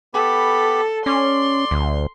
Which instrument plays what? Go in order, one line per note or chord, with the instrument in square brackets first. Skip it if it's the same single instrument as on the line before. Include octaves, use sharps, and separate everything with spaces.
[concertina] B3 G4 B5 [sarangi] A4
[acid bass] C#4 [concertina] D5 [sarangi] C6
[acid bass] D2